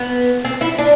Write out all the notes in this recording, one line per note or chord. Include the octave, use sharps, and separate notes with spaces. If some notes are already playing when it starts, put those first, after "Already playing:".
Already playing: B3
C4
E4
D4